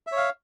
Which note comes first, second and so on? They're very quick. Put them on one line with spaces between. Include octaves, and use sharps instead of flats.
E5 C#5 F5